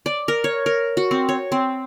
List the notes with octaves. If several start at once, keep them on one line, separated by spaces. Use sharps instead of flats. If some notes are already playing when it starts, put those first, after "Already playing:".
D5
A#4
C#5
A#4
F#4
C4
C#5
C4